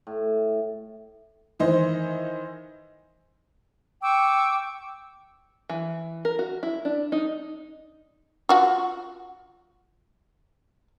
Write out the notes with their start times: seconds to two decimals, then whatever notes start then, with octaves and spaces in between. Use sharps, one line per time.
0.07 A2
1.59 D#3 E3 C5 D#5
4.02 G5 C#6 D6 E6
5.70 E3
6.25 A#4
6.39 F#4
6.63 E4
6.85 D4
7.12 D#4
8.49 F4 F#4 F#5